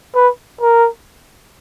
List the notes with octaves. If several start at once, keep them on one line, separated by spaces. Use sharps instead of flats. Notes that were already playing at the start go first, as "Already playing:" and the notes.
B4
A#4